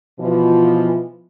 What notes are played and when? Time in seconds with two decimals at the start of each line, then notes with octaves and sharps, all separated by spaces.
0.20 B2 E3 F3